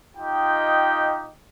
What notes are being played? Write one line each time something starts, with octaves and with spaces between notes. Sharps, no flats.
D#4 F4 G4 D#5 G5